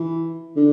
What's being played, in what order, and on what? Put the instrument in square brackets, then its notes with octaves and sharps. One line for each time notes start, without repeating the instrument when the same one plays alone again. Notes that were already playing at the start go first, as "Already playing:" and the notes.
Already playing: [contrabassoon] E3
D3